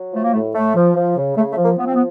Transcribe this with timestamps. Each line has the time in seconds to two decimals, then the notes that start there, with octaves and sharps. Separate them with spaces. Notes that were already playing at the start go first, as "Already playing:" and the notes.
Already playing: F#3
0.13 F3 A3
0.23 A#3
0.33 A2 A3
0.55 A2 A3
0.76 F3
0.95 F3
1.17 C#3
1.37 C#3 A3
1.51 A3
1.57 F3
1.65 A#3
1.77 F3 B3
1.86 C4
1.95 B3